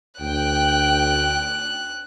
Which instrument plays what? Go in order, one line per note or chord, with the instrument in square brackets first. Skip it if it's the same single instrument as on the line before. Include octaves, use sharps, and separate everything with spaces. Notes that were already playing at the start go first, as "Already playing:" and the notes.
[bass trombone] D2 [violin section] G5 [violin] F#6